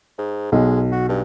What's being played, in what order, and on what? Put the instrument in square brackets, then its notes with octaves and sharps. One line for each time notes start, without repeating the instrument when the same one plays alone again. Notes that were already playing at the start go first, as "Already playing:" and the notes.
[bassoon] G#2
[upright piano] B1 [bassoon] G#3
[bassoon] F#4
G2